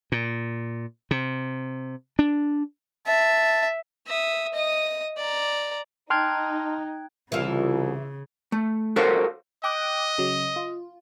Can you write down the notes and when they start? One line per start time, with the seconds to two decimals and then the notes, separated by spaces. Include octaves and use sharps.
0.12 A#2
1.11 C3
2.19 D4
3.07 E5 A5
4.06 E5 D#6
4.54 D#5 D#6
5.17 D5 A#5
6.10 D#4 G5 A5 C6 F6 F#6 G#6
7.32 C2 C#3 E3 F4
8.52 A3
8.96 F#4 A4 A#4 C5 C#5 F5
9.64 D#5 G5 D6 F#6
10.18 C#3 F#3
10.56 F4